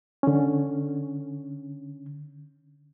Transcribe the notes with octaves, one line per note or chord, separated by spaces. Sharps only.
D3 C#4